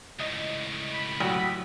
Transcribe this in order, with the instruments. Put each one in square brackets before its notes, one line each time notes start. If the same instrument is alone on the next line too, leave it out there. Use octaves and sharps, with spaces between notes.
[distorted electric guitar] C#2 A2 [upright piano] D#5
[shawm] B5
[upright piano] A1 F#4 [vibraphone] F#3 G5